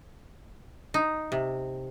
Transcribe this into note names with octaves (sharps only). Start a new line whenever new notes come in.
D#4
C3